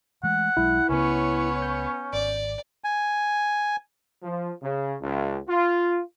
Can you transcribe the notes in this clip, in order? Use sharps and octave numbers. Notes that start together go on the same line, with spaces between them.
E3 G#3 A3 F#5
B1 F#3 G#3 E4
C#2 C#3 B3 C#4 C#5
G6
G#1 D5
G#5
F3
C#3
C#2
F4